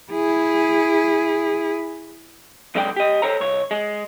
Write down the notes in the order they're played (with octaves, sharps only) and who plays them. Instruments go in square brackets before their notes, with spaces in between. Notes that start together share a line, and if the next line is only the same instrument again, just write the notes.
[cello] E4 G#4
[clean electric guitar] B1 D3 G#3 E4 D5 G5
G4 D#5
A4 C5 C#5 A#5
C2 C#5
G#3